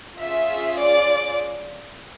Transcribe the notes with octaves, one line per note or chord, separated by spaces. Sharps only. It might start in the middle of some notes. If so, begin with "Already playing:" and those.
C#4 F4 G#4 E5
D5